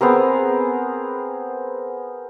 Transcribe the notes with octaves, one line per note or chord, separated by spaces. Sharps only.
B3 C4 G#4 A#4